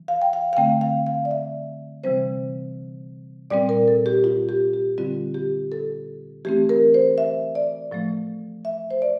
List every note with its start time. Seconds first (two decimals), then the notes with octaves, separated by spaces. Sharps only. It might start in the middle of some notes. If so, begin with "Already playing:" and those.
Already playing: E3
0.08 F5
0.22 G5
0.33 F5
0.53 F5
0.57 D3 A3 C4 G5
0.81 F5
1.07 F5
1.25 D5
1.31 E5
2.04 C3 E3 G3 C4 C5
3.50 A#2 G3 C4 D5
3.69 A#4
3.88 A4
4.06 G4
4.24 F4
4.49 G4
4.73 G4
4.98 D3 G3 C4 F4
5.34 G4
5.72 A4
6.45 E3 A3 C4 G4
6.69 A#4
6.94 C5
7.18 E5
7.55 D5
7.91 A2 F3 A3
8.65 E5
8.91 C5
9.02 D5